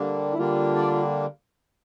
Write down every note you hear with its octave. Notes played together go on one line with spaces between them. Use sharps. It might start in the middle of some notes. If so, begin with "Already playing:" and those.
Already playing: D3 G3 A#3 D4
E4
D3 G3 A#3 D4 F4
D5